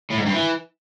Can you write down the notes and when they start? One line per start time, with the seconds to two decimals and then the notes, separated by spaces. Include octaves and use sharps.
0.11 A2
0.18 G#2
0.26 G2
0.34 E3